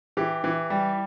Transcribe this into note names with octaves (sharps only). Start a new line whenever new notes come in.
E3 G4
E3
G3